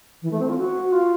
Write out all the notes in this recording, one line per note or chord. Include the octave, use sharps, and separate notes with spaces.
E3
A3
C4
F4
F#4
F4